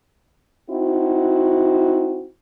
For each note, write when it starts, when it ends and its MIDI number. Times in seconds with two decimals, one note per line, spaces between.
0.69 2.25 60
0.69 2.25 63
0.69 2.25 64
0.69 2.25 66